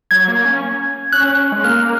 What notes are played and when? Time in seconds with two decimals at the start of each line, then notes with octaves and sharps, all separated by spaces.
0.11 F#3 G#6
0.28 A#3
0.45 C#4
1.13 C#4 F#6
1.52 G#3
1.64 A#3 F6